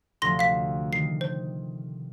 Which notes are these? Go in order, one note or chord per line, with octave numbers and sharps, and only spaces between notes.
D2 C3 F3 C6 A#6
F5 B6
D#3 C7
C5